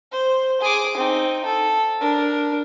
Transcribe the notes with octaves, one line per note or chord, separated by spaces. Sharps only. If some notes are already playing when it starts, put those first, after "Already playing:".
C5
G#4 D6
C4 D#4
A4
D4 A#4